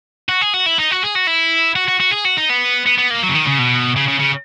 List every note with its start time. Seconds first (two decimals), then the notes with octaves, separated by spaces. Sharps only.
0.29 F#4
0.41 G#4
0.54 F#4
0.66 E4
0.78 D#4
0.91 F#4
1.03 G#4
1.15 F#4
1.27 E4
1.76 F#4
1.88 F#4
2.00 F#4
2.13 G#4
2.25 F#4
2.37 D#4
2.50 B3
2.86 B3
2.98 B3
3.10 A#3
3.23 F#3
3.29 C#3
3.35 D#3
3.47 C#3
3.59 B2
3.96 C#3
4.08 C#3
4.20 C#3